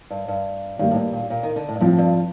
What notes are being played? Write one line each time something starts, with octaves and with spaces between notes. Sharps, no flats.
G2
G2
G2 D#3 G3 A#3
A2
G2
A#2
A#2
D#3
D3
A2
G2
A2 F3 C4 F4
G2